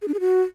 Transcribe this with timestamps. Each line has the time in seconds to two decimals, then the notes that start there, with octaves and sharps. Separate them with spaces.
0.02 G#4
0.08 D4
0.14 G#4
0.20 F#4